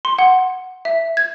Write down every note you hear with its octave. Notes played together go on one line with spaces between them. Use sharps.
C6
F#5
E5
G#6